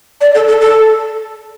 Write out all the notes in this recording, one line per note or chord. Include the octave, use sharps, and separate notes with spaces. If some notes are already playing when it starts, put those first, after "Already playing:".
D5
A4
A4
A4